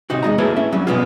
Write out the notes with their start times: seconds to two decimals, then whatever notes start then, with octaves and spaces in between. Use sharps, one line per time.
0.10 C3 D#4 F#4
0.23 E2 G#3 D#5 A#5
0.38 A3 A#3 E4 G#4 B4 C#5
0.56 C#4 E5
0.72 F#3 G3 C#4
0.87 B2 F3 F#3 B3 C#4 F4